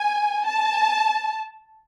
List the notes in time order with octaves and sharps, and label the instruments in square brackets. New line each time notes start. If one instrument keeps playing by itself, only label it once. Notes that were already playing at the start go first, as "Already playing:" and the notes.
Already playing: [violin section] G#5
A5